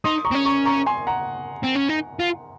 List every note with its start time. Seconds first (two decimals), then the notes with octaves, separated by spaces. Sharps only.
0.04 D#4 C6 D#6
0.25 A#5 C#6
0.31 C4
0.35 C#4
0.45 A#5 C#6
0.65 A#5 C#6
0.86 G#5 C6
1.07 F#5 A#5
1.64 C4
1.76 C#4
1.89 D#4
2.20 F4